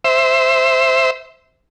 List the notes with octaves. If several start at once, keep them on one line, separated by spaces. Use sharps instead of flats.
C5 E5